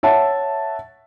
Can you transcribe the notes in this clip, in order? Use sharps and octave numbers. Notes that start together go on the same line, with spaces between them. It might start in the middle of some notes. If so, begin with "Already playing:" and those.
C#5 E5 F#5 A5